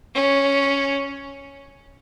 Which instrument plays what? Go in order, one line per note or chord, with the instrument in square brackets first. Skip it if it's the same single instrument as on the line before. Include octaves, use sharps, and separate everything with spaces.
[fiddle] C#4